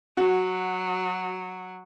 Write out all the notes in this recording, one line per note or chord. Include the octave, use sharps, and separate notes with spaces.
F#3 F#4